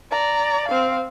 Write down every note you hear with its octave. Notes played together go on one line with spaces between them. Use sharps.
D5 A#5
C4 F5